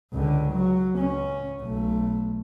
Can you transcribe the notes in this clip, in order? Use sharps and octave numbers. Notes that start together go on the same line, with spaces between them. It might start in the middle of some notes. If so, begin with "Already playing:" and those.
C#2 D3
F#3
C#2 C#4
B1 A3